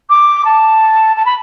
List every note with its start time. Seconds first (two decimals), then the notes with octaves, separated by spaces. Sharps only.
0.09 D6
0.44 A5
1.16 A5
1.25 B5